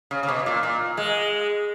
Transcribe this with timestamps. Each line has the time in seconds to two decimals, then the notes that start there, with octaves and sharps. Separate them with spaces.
0.11 C#3
0.23 C#3
0.29 B2
0.46 A#2
0.63 A#2
0.97 G#3